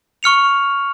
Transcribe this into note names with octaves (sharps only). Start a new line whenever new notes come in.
C#6 F6 C#7 F7